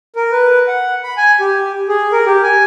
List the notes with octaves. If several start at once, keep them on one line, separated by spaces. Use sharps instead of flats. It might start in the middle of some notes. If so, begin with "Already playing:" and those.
A#4
B4
F#5
B5
G#5
G4
G#4
A#4
G4
G#5